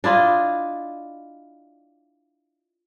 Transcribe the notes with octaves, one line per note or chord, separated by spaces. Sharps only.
D4 E4 F4 D#5